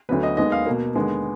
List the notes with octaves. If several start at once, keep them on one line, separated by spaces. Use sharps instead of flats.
D2 D3 F#3 B3 B4
D#5
D#2 D#3 G#3 B3 D#5
F5
B2 A#3
D#2 D3 G#3 B3